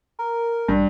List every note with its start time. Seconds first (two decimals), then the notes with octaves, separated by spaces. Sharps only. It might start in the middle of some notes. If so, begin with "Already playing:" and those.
0.19 A#4
0.68 A1 G2